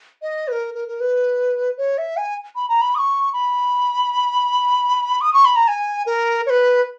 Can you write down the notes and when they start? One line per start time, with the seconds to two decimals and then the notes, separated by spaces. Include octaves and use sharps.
0.22 D#5
0.48 B4
0.52 A#4
0.74 A#4
0.88 A#4
1.00 B4
1.77 C#5
1.98 E5
2.17 G#5
2.56 B5
2.69 A#5
2.81 B5
2.95 D#6
2.98 C#6
3.33 B5
5.21 D#6
5.34 C#6
5.45 B5
5.56 A#5
5.68 G#5
6.06 A#4
6.46 C#5
6.50 B4